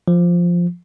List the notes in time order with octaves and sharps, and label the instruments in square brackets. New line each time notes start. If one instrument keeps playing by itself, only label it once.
[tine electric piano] F3